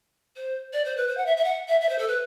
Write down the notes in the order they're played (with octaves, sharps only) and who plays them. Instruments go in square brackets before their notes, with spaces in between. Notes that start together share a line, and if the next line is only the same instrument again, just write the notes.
[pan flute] C5
D5
C5
B4
C5
F#5
E5
E5
F#5
E5
E5
C5
A4
B4